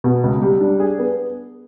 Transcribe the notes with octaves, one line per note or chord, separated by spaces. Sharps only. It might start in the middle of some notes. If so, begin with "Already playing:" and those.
B2
C#2
G3
D4
G#4
B3